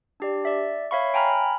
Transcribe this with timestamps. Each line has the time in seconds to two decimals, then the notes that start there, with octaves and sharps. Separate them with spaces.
0.20 D4 G4 D5
0.45 D5 E5
0.91 C#5 E5 F5 B5 C#6
1.14 G5 G#5 A#5 B5 F6